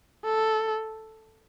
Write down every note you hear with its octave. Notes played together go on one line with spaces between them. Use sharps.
A4